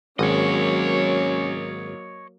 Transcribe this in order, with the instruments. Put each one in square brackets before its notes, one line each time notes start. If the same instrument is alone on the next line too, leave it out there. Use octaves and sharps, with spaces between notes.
[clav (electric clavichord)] G#1 [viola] F#3 A#3 [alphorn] C#4 [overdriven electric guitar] C#5 D#5